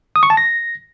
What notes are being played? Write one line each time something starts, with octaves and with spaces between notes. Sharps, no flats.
D#6
C#6
A5
A#6